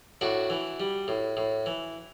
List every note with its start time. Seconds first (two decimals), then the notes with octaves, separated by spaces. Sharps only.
0.21 A2 D4 F#4
0.50 E3
0.80 G3
1.08 A2
1.37 A2
1.66 E3